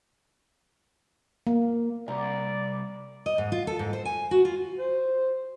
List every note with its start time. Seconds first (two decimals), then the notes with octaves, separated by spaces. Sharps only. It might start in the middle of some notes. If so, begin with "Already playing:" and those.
1.47 A#3
2.08 C2 D5 A#5
3.26 D#5
3.38 G#2
3.52 F4
3.67 A4
3.79 G#2
3.93 C5
4.05 G#5
4.31 F#4
4.45 F4
4.78 C5